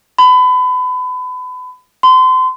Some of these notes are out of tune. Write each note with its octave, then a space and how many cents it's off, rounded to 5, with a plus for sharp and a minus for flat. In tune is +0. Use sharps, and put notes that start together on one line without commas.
B5 +30
C6 -35